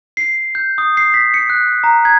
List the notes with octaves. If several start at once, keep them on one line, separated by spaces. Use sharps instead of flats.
C7
G6
D#6
C7
B6
C#7
F#6
A#5
G#6